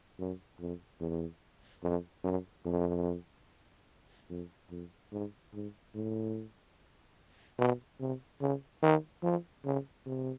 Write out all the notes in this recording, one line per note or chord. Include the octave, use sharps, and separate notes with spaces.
F#2
F2
E2
F2
F#2
F2
F2
F2
G#2
G#2
A2
B2
C3
C#3
D#3
F3
C#3
C3